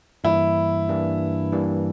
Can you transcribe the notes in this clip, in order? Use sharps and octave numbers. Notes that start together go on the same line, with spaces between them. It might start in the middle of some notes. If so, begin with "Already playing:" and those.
G2 E3 G3 A#3 D4 E4
G2 E3 G3 A#3 D4
G2 E3 G3 A#3 D4